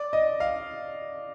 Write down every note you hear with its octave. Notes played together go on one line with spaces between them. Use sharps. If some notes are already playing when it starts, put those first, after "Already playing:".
Already playing: D5
D#5
F5